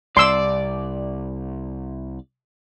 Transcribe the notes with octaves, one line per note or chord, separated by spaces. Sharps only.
C2 D5 C6 E6